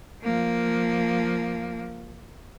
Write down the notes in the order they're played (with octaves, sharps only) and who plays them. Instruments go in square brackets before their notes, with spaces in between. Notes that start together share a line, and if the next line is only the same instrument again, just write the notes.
[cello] F3 A#3